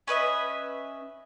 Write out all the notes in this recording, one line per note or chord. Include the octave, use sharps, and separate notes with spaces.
C#4 B4 D#5 E5